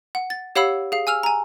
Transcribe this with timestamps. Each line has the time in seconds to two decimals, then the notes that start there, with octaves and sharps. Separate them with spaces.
0.15 F#5
0.30 A6
0.56 G4 C#5 F5 F#5 B5 E6
0.92 G#4 F5
1.07 G#5 E6 F6 F7
1.23 G#5 A#5